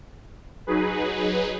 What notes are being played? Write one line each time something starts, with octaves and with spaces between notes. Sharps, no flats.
F#3 D#4 G#4 B4